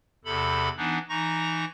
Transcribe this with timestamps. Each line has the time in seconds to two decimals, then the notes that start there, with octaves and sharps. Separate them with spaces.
0.25 E2 C3 A4 B5
0.77 E3 B3 D4 D#4
1.09 E3 D#4 A#5 C#6 A#6